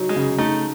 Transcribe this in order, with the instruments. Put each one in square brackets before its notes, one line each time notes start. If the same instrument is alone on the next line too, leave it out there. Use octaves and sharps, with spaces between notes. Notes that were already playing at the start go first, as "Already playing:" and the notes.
Already playing: [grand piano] F#3 D#4
[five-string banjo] G#3
[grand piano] C#3
[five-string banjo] A3 [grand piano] D#4